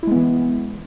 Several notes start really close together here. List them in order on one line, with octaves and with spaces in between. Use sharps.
E4 G#3 B3 E3